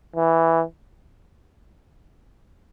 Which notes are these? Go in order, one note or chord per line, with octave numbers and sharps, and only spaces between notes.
E3